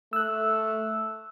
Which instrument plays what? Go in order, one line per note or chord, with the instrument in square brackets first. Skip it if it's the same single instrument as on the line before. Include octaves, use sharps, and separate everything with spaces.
[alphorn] A3 [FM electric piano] E6 F#6